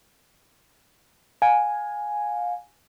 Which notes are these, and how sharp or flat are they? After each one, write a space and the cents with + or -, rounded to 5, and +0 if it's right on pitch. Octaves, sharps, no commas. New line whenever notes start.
F5 +30 G#5 +0